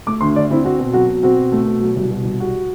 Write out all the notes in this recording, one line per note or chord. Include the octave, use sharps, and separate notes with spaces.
A3 D6
D2 C6
D3 D5
C4 E4
C4 F#4
B2
F#3 F#4
B2
C4 F#4
B2
A3
B2
F#3
C2
B2
C2
G3 F#4